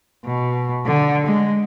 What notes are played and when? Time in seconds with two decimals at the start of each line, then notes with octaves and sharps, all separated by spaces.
0.25 B2
0.86 D3
1.26 G#3